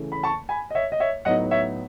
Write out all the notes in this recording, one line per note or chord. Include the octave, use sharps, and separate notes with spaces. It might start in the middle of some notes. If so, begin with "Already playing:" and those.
Already playing: C#3 E3 A3
B5
A5 C#6
G#5 B5
D#5
C#5 E5
D#5
C#5 E5
A2 F#3 B3 D#4 D#5 F#5
C#5 E5